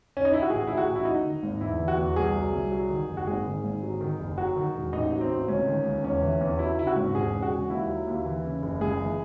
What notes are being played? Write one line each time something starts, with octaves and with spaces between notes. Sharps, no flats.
C#4
D#4
E4
F#4
A1 G#4
F#3 E4
F#4
A1
E4
F#3 D#4
D#3
G#1
E2 E4
E3
F#4
E2
C2 G#4
F#3
C2
F#3
D#3
F#1
F#4
G#1 G#4
D#3
G#1
F#3
D#3
F#1
F#3 F#4
D#3
E1
A1 D#4
F#3
C4
A1
C#2 C#4
D#3
C#2
E2 C#4
E3
E2
F#3 E4
C#3 E4
F#4
G#1
E1 G#4
C#3
F#4
E1
D#2 E4
F#3
D#2
E3
C#3
F#1
C#2 G#4
E3